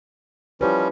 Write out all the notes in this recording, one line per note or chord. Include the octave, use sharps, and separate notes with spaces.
F3 G3 C#4 E4 G4 B4